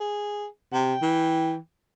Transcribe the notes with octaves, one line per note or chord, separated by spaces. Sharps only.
G#4
C3 G5
E3